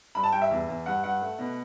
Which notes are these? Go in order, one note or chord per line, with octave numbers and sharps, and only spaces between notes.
G2 B5
A5
G2 G5
E5
E2
E2
G2 F#5
G2 F#5
A3
B2